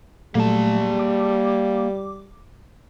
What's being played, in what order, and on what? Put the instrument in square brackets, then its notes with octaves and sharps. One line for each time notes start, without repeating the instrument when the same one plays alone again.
[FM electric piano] A#2 F#3 A3 [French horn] G3 [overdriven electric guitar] A#3 A5
[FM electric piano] D6